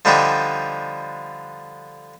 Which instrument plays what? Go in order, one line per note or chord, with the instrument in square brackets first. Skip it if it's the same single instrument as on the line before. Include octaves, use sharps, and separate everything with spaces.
[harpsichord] D3 F3 G3 D4 D#4 G4